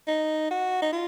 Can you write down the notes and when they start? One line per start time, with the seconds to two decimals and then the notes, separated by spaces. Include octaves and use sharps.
0.08 D#4
0.51 F#4
0.82 D#4
0.93 F4